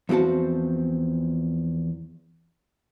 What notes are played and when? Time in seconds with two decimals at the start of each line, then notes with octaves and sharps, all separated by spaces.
0.09 E2 F3 C4 F#4 A5